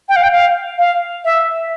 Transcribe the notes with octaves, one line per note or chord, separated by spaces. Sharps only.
G5
F5
G5
F5
F5
E5